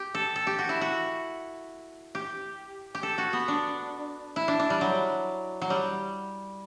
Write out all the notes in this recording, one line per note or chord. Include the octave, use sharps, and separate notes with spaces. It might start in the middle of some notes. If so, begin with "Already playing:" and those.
Already playing: G4
A4
A4
G4
F#4
E4
F#4
G4
G4
A4
F#4
B3
D4
E4
D4
D4
G3
F#3
F#3
G3